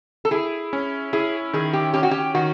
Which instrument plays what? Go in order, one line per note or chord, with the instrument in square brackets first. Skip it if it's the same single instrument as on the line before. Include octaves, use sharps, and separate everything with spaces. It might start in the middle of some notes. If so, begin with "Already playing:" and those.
[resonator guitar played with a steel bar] A4
[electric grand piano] E4 [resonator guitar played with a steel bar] G#4
[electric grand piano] C#4
[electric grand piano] E4 [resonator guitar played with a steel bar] G#4
[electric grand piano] D#3 [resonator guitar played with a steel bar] G#4
[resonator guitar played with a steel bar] G4
[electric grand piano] C#4 [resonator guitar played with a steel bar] G4
[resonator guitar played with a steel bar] F#4
G4
[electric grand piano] D#3 [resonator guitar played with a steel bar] F#4